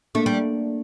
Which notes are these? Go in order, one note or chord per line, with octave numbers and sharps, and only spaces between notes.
A3 A#3 D4
G3